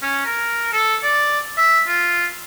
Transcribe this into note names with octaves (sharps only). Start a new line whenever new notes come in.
C#4
A#4
A4
D5
E5
F4